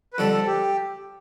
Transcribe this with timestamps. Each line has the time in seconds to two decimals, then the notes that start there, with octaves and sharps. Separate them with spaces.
0.13 B4
0.18 F2 D3 G3 A4
0.32 A4
0.47 G4